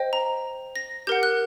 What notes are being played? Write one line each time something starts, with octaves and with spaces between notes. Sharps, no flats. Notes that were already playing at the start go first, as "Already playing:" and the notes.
Already playing: C5 D#5 G5
A#5
A#6
G4 A#4 F#5 G6
F#6